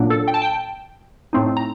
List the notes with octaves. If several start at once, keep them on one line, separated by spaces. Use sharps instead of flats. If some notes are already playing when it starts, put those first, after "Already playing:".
Already playing: A#2 F#3 A#3 D4
A4
G5
A5
G5
A2 A3 C4 D#4
A#5